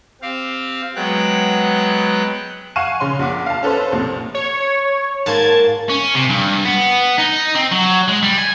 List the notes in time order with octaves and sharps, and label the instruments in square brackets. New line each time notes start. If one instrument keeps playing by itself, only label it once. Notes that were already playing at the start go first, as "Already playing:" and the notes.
[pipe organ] C4 G4 F5
F#3 G#3 B3 G5 F#6
[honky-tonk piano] F5 F#5 G#5 C#6 D#7 E7
C#3 C#4 C6
A#1 F#5 D6
F5 A5
C#4 A4 B4 C5
C2 A#2
[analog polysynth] C#5
[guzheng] G#2 A#3 [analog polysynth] A5 G#6
[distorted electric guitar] C#4
C3
G2
B3
D#4
C4
F#3
G#3
G3
G#5